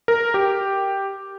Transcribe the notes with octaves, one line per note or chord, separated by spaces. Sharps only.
A#4
G4